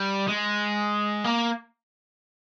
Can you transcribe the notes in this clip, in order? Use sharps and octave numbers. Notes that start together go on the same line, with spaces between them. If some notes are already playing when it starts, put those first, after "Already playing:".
Already playing: G3
G#3
A#3